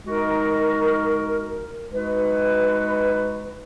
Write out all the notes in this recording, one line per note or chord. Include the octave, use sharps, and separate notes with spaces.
G#3 D#4 F#4 A#4
G#3 D#4 F#4 B4